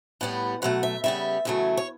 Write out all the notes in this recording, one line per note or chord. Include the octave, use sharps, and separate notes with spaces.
A2 G3 B3 F#5
B2 F#3 A3 F#5
E5
C#3 G3 B3 E5
E2 C#3 F#3 A3
C#5